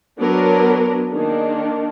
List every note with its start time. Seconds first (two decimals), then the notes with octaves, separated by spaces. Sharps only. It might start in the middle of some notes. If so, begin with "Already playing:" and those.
0.19 F#3 B3 D4 A#4
1.12 D#3 A#3 D4 G#4